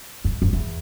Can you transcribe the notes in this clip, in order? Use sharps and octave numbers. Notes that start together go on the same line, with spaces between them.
F#2
F#2
E2